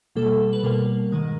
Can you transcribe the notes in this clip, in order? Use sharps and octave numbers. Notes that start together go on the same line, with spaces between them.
B2 G3 A#3 A4
B4
B2 G3 A#3 A#4
G#2 D#3 G#3